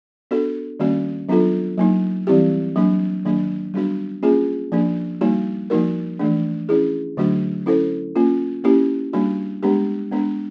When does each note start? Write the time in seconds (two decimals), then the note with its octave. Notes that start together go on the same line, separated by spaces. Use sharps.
0.31 B3 D4 F#4 A4
0.80 D#3 G3 A#3 C#4 F#4
1.29 F#3 B3 D4 F4 A4
1.78 F#3 A#3 D#4
2.27 E3 G3 C4 E4 G4
2.76 F#3 A#3 D4
3.25 D#3 F#3 A#3 D4
3.74 G3 B3 D4 F#4
4.23 A#3 C#4 F4 G#4
4.72 F3 A#3 D4
5.21 G3 A#3 D#4 F#4
5.70 F3 A#3 D#4 F#4 A#4
6.19 E3 A3 D4
6.69 C#4 E4 G#4
7.17 D3 F#3 A3 D4 F#4
7.66 C#4 E4 A4 C5
8.16 A#3 C#4 F4
8.64 A#3 C#4 E4 G4
9.13 G3 A#3 D4 F#4
9.63 G#3 B3 D4 G4
10.12 G#3 B3 D4